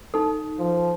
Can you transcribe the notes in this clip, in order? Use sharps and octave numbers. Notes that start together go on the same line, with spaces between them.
D#4 A4
F3